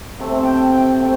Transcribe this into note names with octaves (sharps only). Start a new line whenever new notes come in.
C3 A3 C4
G5 A5
G5
C3 A3 C4